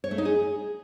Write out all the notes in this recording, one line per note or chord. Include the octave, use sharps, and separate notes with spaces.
C#5
A3
D#4
G#4